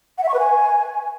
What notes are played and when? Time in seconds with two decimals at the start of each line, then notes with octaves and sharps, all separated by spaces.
0.18 F#5
0.23 E5
0.29 C#6
0.34 B4
0.39 G#5